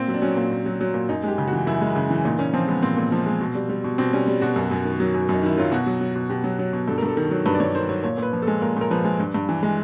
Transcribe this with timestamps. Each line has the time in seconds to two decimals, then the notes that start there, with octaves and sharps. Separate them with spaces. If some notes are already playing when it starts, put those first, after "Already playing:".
Already playing: A#2 C4
0.08 F#3
0.14 D4
0.22 F#3 C#4
0.37 A#2
0.51 A#2
0.66 F#3
0.81 F#3
0.94 A#2
1.09 F#2 D#4
1.24 G#3 G4
1.38 C#3
1.48 F#4
1.53 E3
1.67 F#2 E4
1.81 G#3
1.96 C#3
2.10 E3
2.25 A#2 D#4
2.39 A#2 C#4
2.53 F3 C4
2.68 G#3 B3
2.83 A#2 C4
2.97 A#2
3.12 F3
3.26 G#3
3.41 B2
3.55 G3
3.69 G3
3.84 B2
3.98 B2 C4
4.13 G3 C#4
4.27 G3
4.42 B2 F#4
4.56 F#2
4.71 F#2
4.85 D#3
5.00 F#3
5.14 F#2
5.29 F#2 D#4
5.43 D#3 E4
5.58 F#3 F4
5.72 B2 F#4
5.86 F#3
6.01 F#3
6.16 B2
6.30 B2 G4
6.44 F#3
6.59 F#3
6.73 B2
6.88 G2 A4
6.98 G2 A#4
7.08 A4
7.17 D#3
7.31 F#3
7.46 G2 B4
7.54 D5
7.60 G2 C#5
7.75 D#3 C5
7.89 F#3 C#5
8.03 A#2 C#5
8.18 A#2 B4
8.33 F3
8.42 A4
8.47 G#3
8.61 A#2 A#4
8.77 A#2 A#4
8.91 F3 B4
9.04 G#3
9.20 G2
9.34 G2
9.49 E3
9.63 G#3